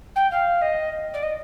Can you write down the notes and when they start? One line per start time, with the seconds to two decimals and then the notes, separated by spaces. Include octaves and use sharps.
0.15 G5
0.31 F5
0.61 D#5
1.13 D5
1.22 D#5